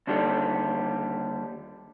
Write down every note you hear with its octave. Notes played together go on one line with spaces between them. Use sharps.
D#2 D3 D#3 G3